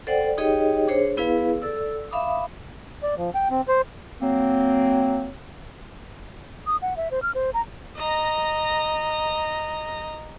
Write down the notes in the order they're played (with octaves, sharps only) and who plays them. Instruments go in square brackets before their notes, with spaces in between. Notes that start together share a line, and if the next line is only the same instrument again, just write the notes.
[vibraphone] A4 C5 D5 F#5 G5
D#4 G4 G#4 C#5 D#5 G5
D4 G#4 C5 C#5
B3 E4 G#4 B4 F5
A4 D5 E6
E5 F5 B5 D6 D#6
[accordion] D5
F3
G5
C4
C5
[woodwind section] F#3 A#3 C4
[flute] D#6
F#5
E5
C5
F6
C5
A#5
[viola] D#5 A#5